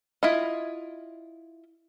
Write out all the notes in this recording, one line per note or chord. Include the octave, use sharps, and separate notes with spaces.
E4 F4 D#5